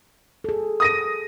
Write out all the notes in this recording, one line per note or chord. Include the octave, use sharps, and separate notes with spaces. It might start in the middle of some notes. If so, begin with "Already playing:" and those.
G#4 A4
D#6 A#6 D#7